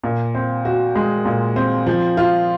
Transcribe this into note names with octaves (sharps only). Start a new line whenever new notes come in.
A#2
C4
F#4
G#3
A#2
C4
F3
F4